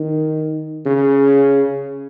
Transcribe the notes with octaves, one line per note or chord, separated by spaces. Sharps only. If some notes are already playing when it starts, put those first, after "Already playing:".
Already playing: D#3
C#3